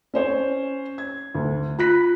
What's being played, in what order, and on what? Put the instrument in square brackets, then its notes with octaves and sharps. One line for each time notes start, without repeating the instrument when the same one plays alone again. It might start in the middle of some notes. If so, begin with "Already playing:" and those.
[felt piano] C#4 C5 C#5
G#6
D2
[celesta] F4 [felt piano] B5 F#6 B6